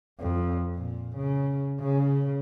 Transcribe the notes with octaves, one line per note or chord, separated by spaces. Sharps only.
F2
A#2
C#3
C#3